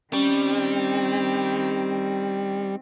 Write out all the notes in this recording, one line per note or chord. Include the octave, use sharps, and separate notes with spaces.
D#3 G3 C4 C#4